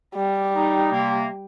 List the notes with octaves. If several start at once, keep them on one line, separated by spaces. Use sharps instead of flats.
G3
D#4
C3 A#3